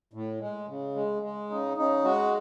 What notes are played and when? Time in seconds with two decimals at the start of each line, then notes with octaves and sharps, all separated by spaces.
0.13 A2
0.41 G#3
0.69 C#3
0.95 G#3
1.22 G#3
1.50 C#3 D#4
1.77 C#3 D#4
2.04 G#3 F#4